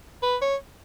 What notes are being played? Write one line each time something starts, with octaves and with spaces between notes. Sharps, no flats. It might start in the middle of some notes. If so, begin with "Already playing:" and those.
B4
C#5